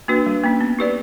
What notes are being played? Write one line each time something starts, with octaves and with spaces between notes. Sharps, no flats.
A#3 D4 F#4 B4
G3
A#3 C#4
B3
D#4 G4 B4 D5